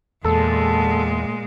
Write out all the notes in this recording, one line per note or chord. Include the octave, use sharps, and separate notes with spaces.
E2 A#2 G#3 A4